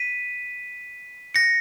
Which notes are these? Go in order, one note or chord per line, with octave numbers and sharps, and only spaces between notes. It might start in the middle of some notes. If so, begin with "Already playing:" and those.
Already playing: B6 D#7
A#6 C#7